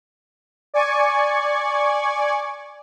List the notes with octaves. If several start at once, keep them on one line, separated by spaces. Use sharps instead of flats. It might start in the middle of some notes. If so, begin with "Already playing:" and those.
D5 G#5 C#6